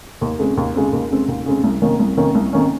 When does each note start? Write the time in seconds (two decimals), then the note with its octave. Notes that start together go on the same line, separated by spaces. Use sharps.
0.21 D#2
0.39 C#3 G#3 C4
0.57 D#2
0.75 C#3 G#3 C4
0.93 D#2
1.10 C#3 G#3 C4
1.28 D#2
1.46 C#3 G#3 C4
1.64 C2
1.82 C3 D#3 A#3 C#4
1.99 C2
2.17 C3 D#3 A#3 C#4
2.35 C2
2.53 C3 D#3 A#3 C#4